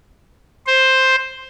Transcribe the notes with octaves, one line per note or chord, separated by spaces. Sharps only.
C5